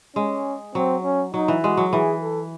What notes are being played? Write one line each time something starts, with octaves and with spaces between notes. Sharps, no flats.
G#3 C#4
F#3 C4
C#4
F#3 D#4
E3
G#3 F#4
F#3
E3 G#4
A4